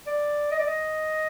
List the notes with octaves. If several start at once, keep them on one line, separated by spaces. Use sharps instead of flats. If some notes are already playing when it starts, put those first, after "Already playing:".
D5
D#5
D5
D#5